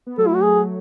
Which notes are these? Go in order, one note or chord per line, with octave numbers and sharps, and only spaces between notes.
B3
F#3 A3 A4
E4
F#4
G#4